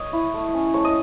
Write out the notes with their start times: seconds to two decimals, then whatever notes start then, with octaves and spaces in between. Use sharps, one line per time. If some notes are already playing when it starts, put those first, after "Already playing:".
Already playing: C#5 D#5
0.13 E4
0.34 A3
0.54 C#4
0.74 A3 C#5
0.85 D#5